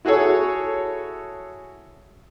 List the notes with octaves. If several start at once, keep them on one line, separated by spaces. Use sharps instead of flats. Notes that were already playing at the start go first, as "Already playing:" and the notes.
E4 F#4 G#4 A4 C#5